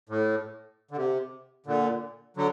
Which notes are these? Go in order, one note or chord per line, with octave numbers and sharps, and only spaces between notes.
A2
D3
C3
A#2 D3
D3 F#3